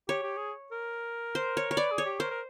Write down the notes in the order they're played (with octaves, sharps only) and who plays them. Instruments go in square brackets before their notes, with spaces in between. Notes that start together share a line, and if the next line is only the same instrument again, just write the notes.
[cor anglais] G4 [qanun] C#5
[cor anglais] G4
G#4
A#4
[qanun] C5
C#5
C#5
[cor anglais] B4 [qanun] D5
[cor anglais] G#4
[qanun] C#5
[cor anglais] G4
[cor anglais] A#4 [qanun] C5
[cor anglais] A#4